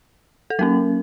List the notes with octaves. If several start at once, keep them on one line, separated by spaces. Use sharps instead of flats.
A4
F#3 A#3 C#4 A#4